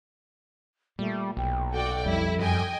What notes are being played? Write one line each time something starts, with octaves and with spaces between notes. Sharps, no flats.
A#2 G3 A3
B1 G5
F#4 A4 D5 G5
F2 G3 E4
F#2 D#5 G5 G#5